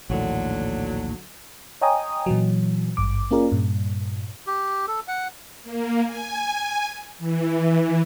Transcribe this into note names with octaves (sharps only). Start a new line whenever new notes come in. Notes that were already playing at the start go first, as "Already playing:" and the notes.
A#1 D#2 A2 D3 F#3
C#5 D#5 G5 G#5 A#5 D#6
A#2 E3 F#3
G#1 G2 D6
A#3 C#4 F4 G#4 A#4 D5
G2 A#2
G4
A4
F#5
A#3
G#5
E3